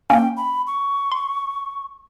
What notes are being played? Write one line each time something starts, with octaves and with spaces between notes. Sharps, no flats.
A#3 C#4 G5
B5
C#6
C6